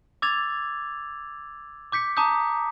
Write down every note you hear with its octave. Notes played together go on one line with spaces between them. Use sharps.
D6 E6 G#6 A6 F7
D6 G6 B6 C#7
A5 A#5 D6 D#6 G6